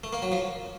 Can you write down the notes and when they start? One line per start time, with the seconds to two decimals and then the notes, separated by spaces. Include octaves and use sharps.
0.04 A3
0.13 A#3
0.22 F#3
0.32 F3